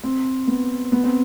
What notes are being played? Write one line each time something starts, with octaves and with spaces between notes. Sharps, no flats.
C4
B3
B3
C4